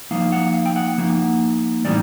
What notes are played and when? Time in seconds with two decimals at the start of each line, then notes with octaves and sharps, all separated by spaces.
0.11 F3 A#3 D#4 F5
0.32 F#5
0.54 F5
0.66 G5
0.76 F#5
0.98 F3 A#3 D#4
1.84 A2 E3 G3 C4 D#4 D5